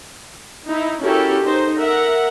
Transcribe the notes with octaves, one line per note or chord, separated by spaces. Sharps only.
D#4 E4
C#4 E4 F#4 G4 A4 A#4
D#4 C5
A#4 E5 F#5